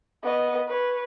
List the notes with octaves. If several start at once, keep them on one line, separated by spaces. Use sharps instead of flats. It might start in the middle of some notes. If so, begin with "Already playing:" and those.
B3 D#5
B4 C#5